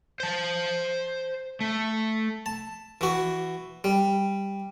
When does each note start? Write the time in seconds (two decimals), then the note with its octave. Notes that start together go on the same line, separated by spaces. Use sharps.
0.20 C5 A5
1.61 A3
2.46 A5
3.01 E3 F#4
3.84 G3